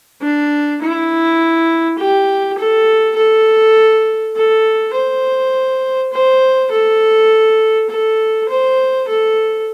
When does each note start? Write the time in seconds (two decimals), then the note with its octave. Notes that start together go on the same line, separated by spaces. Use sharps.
0.22 D4
0.81 E4
1.98 G4
2.58 A4
3.16 A4
4.36 A4
4.94 C5
6.13 C5
6.71 A4
7.89 A4
8.49 C5
9.08 A4